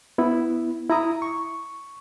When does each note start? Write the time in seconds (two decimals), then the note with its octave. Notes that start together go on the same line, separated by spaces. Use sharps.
0.18 B3 E4
0.89 E4 A#5 D#6
1.22 C#6